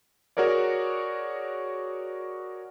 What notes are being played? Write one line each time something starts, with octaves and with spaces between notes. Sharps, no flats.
F#4 G#4 A#4 C#5 D5